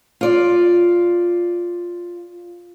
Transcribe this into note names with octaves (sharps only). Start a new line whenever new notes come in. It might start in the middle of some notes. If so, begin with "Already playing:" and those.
F4 D5